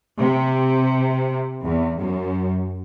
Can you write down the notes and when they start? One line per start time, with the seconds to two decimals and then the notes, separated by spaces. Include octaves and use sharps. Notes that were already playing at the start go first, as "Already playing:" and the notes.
0.21 C3
1.62 E2
1.98 F#2